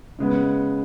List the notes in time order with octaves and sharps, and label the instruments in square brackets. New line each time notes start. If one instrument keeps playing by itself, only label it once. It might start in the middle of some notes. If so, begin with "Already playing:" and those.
[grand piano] C#3 G#3 B3